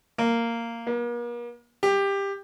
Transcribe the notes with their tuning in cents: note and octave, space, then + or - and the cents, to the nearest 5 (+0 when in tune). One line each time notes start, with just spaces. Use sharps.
A#3 -10
A#3 +45
G4 +15